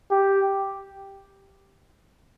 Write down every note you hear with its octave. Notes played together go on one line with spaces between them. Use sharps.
G4